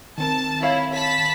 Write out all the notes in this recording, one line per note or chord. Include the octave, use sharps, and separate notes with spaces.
D#3 C4 A#4 A5
E4 C#5 F5
A5 B5 B6